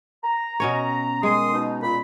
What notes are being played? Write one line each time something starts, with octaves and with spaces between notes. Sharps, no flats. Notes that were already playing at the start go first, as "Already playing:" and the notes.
A#5
B2 C#4 C#5
D#3 G#3 C6 D#6
B2 D#4
A#2 B5